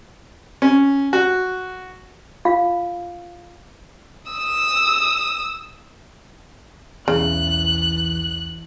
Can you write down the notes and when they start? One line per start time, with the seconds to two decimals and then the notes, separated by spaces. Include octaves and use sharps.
0.62 C#4
1.13 F#4
2.45 F4 F5
4.31 D#6 E6
7.08 B1 E2 C#3 E3 F#6